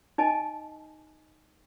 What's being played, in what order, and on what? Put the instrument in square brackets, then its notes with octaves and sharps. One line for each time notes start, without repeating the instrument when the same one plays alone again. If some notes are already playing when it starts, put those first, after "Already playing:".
[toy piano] D#4 D#5 G#5 A5